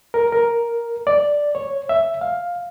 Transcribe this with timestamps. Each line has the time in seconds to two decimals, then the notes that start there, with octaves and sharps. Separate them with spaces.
0.14 A#4
0.32 A#4
1.07 D5
1.55 C#5
1.89 E5
2.21 F5